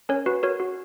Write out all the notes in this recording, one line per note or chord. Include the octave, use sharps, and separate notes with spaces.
C#4 A#4 C#5
F#4 B4
F#4 A#4 C#5
F#4